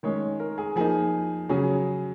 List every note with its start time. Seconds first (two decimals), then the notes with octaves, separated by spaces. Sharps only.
0.03 D#3 G#3 C#4 C#5
0.40 A#4
0.58 G#4
0.76 F3 A#3 D#4 G#4
1.49 C#3 F#3 C#4 G#4